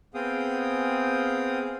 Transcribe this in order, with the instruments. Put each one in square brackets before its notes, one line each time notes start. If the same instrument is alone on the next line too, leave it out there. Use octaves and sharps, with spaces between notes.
[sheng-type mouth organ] B3 C4 G#4 F5 G5 D#6